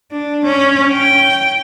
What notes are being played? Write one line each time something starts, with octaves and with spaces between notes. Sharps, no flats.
D4
C#4
G5